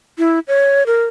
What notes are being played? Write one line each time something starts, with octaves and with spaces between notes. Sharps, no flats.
E4
C#5
A#4